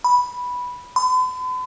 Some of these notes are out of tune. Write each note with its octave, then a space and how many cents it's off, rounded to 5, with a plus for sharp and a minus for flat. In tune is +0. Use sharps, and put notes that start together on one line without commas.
B5 -5
B5 +45